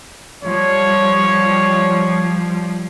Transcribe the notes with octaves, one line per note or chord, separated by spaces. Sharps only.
F3 G3 C#5